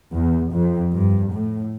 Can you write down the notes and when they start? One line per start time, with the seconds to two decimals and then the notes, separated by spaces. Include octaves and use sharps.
0.13 E2
0.52 F2
0.93 G2
1.32 A2